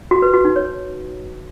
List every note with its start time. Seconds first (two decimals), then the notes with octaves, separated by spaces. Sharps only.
0.11 F#4
0.22 B4
0.33 F#4
0.45 D#4
0.56 C#5